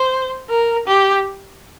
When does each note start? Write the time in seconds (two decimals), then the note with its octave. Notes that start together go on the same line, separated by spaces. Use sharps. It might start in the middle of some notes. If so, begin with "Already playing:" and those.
Already playing: C5
0.50 A#4
0.87 G4